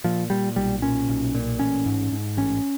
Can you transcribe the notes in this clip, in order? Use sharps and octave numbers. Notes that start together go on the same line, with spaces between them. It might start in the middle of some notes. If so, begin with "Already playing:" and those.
A#2 F3
A#2 G3
B1 G3
A#2 C#4
B1
A#2
A1 C#4
G#2
G#2
A1 C#4